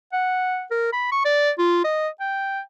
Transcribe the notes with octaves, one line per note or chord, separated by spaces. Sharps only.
F#5
A#4
B5
C#6
D5
F4
D#5
G5